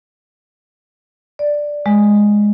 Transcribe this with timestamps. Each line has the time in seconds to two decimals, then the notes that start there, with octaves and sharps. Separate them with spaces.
1.39 D5
1.86 G#3